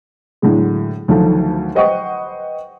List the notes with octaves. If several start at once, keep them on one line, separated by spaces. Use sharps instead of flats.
A2 D3 F#3 G#3
D2 D#3 F3 F#3 A3
B4 C5 D#5 F#5 G5 C#6